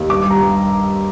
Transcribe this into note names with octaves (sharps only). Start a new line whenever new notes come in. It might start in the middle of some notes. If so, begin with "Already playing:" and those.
Already playing: D#2
G2 D6
G3
A#5
G2